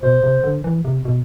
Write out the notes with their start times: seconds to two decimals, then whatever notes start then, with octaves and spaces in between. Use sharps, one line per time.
0.03 B2 C5
0.23 C3
0.44 D3
0.64 E3
0.85 C3
1.05 B2